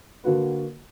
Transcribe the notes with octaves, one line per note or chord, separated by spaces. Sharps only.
D3 F#3 A#3 F#4 B4